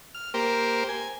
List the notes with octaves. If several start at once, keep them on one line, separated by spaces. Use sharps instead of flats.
F6
A#3 G4 A#4 C5
G#5